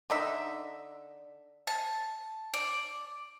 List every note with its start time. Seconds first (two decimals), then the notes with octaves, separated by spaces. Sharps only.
0.10 D3 D#4 E5
1.67 A5
2.54 D5